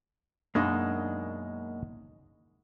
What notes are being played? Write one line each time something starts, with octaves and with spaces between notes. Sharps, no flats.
F#2 B2 G#3 A#3 D4 D#4